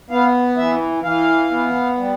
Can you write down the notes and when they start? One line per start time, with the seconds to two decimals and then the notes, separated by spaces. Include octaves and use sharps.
0.10 B3 F5
0.57 E3 E5
1.04 E3 F5
1.51 B3
1.97 G3